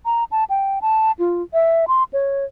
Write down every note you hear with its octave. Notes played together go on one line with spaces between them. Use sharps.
A#5
A5
G5
A5
F4
E5
C6
C#5